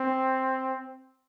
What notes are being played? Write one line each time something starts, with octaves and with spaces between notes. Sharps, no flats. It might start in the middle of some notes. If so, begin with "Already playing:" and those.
Already playing: C4